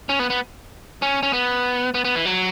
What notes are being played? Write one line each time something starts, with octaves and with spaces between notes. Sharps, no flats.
C#4
B3
B3
C#4
C#4
B3
B3
B3
E3
F#3